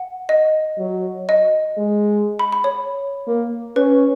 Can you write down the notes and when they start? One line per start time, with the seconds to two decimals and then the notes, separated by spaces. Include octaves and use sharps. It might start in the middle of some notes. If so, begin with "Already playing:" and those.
Already playing: F#5
0.29 D#5
0.78 F#3
1.29 D#5
1.78 G#3
2.39 B5
2.52 B5
2.64 C#5
3.27 A#3
3.76 C#4 B4